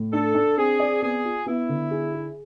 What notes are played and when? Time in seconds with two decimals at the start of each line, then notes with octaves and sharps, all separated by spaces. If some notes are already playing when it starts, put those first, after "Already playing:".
Already playing: A2
0.13 D4 A4
0.35 D4
0.57 C4 G#4
0.80 D5
1.02 B3 G#4
1.25 F4
1.46 B3 E4
1.69 D3
1.91 G#4
2.14 G#4